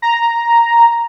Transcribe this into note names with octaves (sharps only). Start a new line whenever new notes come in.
A#5